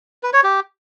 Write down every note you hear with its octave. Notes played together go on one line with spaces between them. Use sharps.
B4
C#5
G4